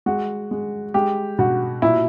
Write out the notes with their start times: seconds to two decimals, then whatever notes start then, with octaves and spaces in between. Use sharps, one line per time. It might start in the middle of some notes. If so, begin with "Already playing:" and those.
0.06 G#3 F#4
0.51 G#3
0.94 G#3 G4
1.39 B2 F#4
1.82 A#2 E4